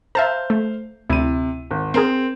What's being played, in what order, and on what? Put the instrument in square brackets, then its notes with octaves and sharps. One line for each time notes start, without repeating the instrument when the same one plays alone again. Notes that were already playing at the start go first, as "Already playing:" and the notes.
[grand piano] C5 F5 [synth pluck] E5 A5 A#5
[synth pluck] A3
[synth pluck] D2 E4 [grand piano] C3 D#7
[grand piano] G#1
[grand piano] C4 [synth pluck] G#4 A#4 C6